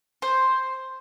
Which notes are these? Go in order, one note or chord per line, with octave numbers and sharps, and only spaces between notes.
C5